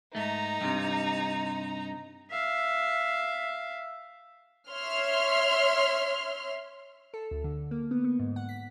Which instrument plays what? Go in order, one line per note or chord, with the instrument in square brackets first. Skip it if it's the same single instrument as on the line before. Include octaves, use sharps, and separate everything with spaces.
[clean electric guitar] G#2 A3 [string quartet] D#4 A#5
[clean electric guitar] G2 C3
[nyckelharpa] E5 F5
[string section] C#5 E5 C6 F6
[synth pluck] A4
D2
D3
A#3
B3
B3
G#2
F#5
B6